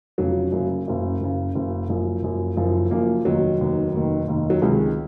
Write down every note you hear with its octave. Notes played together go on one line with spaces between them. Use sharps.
F1 F2 C#3 F#3
F#1 F#2 C#3
F#1 F#2 C#3
F#1 F#2 C#3
F#1 F#2 C#3
F#1 F#2 F3
F#1 F#2 F3
F#1 F#2 F3
F#1 F#2 F3 A#3
F1 D#2 D#3 F#3
F1 D#2 D#3
F1 D#2 D#3
F1 D#2 D#3
F#3
C#2 C3 D#3 G#3